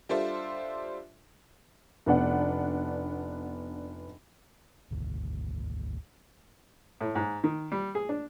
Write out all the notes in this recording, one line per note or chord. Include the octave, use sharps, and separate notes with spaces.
G3 D4 F4 A4 C5 E5
F1 B3 D4 F#5
G#1 D2
A2
G#2
D#3
G3
G#4
D4